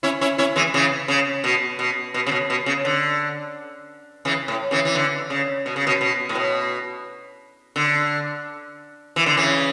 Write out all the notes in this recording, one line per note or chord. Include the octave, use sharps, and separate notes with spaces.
C#4 E4
C#4 E4
C#4 E4
E3 G#3
C#3 E3
C#3
B2
B2
B2
C#3
B2
B2
C#3
D3
C#3 E3
A2
C#3 E3
E3
D3
C#3
B2
C#3
B2
B2
A2
B2
D3
E3
D3
C#3 E3